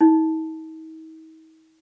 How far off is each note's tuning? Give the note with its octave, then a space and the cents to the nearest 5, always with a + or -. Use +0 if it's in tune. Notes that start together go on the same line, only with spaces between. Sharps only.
D#4 +45